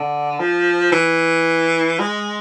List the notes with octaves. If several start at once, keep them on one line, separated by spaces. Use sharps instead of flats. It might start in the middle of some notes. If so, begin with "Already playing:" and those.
Already playing: D3
F3
E3
G#3